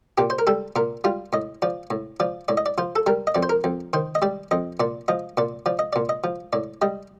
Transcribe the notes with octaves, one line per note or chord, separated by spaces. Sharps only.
A#2 G4
C5
A#4
G3 A4
A#2 A#4
G3 F4
A2 D#5
F3 D5
A2
F3 D5
A2 D5
D#5
D5
F3 C5
A4
G3 A#4
D#5
F2 D5
C5
A#4
F2
D#3 C5
D#5
G3 D5
F2 D#5
A#2 D5
F3 D#5
A#2 D5
F3 D5
D#5
A#2 D5
D#5
F3
A2 D5
G3 D#5